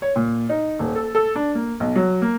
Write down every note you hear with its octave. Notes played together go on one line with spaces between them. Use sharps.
C#5
A#2
D#4
D#1
A4
A4
D4
A#3
B1
F#3
A#3